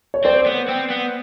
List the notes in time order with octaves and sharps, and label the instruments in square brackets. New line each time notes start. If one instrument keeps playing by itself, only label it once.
[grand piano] C#5
[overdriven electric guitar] C4 [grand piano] C5 D5
[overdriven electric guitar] B3
C4
B3